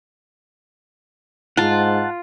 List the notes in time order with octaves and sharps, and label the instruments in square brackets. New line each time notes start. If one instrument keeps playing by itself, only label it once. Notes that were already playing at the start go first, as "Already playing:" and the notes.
[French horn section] G#2 [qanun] F4 [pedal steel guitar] F#5 A5